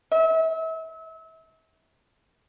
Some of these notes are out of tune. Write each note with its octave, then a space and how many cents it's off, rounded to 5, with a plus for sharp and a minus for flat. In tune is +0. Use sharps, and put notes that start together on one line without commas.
E5 -35